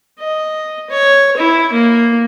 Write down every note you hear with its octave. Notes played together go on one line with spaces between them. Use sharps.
D#5
C#5
E4
A#3